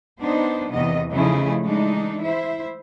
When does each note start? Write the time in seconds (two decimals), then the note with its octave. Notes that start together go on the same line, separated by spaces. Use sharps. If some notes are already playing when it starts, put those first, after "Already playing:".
0.20 B3 D4 D#4 C5
0.71 E2 C3 D#3 B3 D#5
1.12 C#3 F3 A3 D#4 E4 G#4
1.65 E3 G#3 D4 D#4
2.23 E4 C5 E5